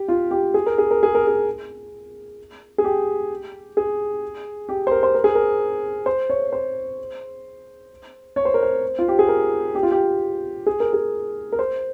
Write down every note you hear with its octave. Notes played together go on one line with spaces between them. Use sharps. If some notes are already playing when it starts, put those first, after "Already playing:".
Already playing: G4
F4
G4
G#4
A#4
G#4
A#4
G#4
A#4
G#4
G#4
G4
G#4
G4
C5
A#4
C5
A#4
G#4
A#4
C5
C#5
C5
C#5
C5
A#4
C5
F4
G4
G#4
A#4
G4
F4
G4
G#4
A#4
G#4
A#4
C5